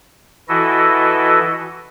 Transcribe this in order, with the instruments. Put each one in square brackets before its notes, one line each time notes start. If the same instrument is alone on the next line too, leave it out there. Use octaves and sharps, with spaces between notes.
[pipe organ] E3 E4 F#4 A4 D#5